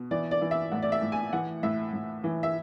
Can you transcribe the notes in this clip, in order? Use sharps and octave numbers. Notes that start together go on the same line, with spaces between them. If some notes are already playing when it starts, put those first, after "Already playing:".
Already playing: B2
E3 D5
D5
E3
E5
A2 F#5
D5
E5
A2
G#5
E3 F#5
A2 E5
A2
E3
E5